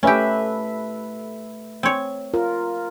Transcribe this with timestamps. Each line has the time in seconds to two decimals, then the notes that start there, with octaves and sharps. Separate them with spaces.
0.03 A3 C#4 G4 B4 E5
1.83 C4 C#5
2.34 F4 A#4